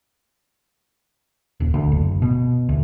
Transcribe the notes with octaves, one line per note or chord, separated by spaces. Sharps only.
D#1
D2
F#1
B2
D2